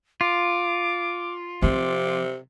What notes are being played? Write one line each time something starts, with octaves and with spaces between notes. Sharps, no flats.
F4 D6
C3 F3 C4 D6